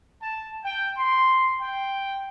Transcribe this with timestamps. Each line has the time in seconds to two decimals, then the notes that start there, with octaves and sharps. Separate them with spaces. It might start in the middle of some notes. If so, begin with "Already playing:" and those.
0.22 A5
0.64 G5
0.97 C6
1.61 G5